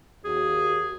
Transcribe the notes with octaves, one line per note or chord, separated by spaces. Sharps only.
D#2 F#4 G#4